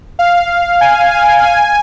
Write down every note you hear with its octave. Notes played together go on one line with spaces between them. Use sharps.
F5
G#5
G#5
G#5